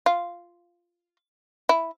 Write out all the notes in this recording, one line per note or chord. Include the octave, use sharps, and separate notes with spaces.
F4
E4